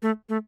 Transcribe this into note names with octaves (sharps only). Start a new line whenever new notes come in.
A3
A3